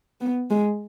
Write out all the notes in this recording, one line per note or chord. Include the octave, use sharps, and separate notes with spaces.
B3
G#3